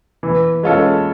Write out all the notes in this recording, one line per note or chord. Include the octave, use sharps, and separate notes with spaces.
E3
G#3 C#4 F4 A4